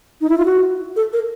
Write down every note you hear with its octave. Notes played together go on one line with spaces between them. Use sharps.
D#4
E4
F4
F#4
A4
A#4